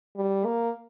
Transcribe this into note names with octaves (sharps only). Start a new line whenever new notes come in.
G3
A#3